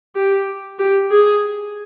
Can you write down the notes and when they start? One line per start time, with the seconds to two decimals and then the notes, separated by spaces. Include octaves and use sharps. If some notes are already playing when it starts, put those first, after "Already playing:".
0.15 G4
0.79 G4
1.11 G#4